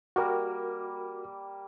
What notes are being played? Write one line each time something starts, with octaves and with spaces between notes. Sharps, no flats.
G3 A#3 F#4 A#4